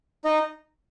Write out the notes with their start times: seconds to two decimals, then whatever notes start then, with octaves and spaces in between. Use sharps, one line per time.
0.25 D#4 D#5